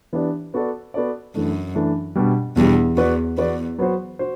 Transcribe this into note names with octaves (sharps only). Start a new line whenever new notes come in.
E3 B3 D4 G4 D5
B3 F#4 A4 D5
B3 F#4 A4 D5
F#2 E3 A3 D4
E3 A3 D4
B2 G3 D4 G4
E2 B2 G3 D4 G4
E2 B3 F#4 B4 D5
E2 B3 F#4 B4 D5
F#3 B3 F#4 C5
F#4 C5